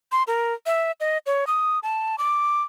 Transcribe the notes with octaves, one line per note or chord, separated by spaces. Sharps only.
C6
A#4
E5
D#5
C#5
D#6
A5
D6